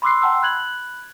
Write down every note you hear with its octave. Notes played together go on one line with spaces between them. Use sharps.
B5 C6 D6 E6 F#6 C7
F#5 G5 A5 A#5 C6 E6
B5 F#6 G#6 F#7